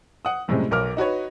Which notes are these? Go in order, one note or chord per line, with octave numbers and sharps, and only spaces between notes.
F#5 D#6
F#2 A2 C3 G3 G#3
B1 A#4 D6 F6
D#4 F#4 B4 C#5